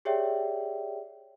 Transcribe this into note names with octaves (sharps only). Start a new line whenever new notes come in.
G4 G#4 C#5 D5 E5 G5